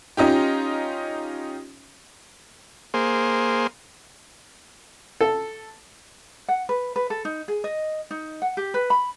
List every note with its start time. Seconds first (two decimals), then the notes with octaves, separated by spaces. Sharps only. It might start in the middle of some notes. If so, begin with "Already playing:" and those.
0.17 C#4 D#4 F4 G4
2.94 A#3 G#4 C5
5.21 A4
6.49 F#5
6.69 B4
6.96 B4
7.10 A4
7.25 D#4
7.48 G#4
7.64 D#5
8.11 D#4
8.42 F#5
8.57 G4
8.74 B4
8.90 B5